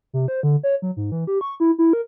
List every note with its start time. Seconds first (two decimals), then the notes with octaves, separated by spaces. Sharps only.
0.13 C3
0.28 C5
0.43 D3
0.63 C#5
0.82 F#3
0.97 G#2
1.12 E3
1.27 G4
1.41 C#6
1.60 E4
1.78 E4
1.93 A#4